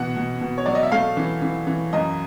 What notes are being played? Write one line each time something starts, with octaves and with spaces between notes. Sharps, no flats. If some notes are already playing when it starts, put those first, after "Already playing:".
Already playing: B2 E3 F#5
B2
B2
C#5
F#3 D5
D#5
E5
A3 F5
E3
E3
E3
F#2 D#5